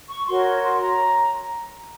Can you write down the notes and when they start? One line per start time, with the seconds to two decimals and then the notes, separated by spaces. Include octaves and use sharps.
0.09 C#6
0.28 F#4 A#4 C#5 C6
0.62 C6
0.81 A#5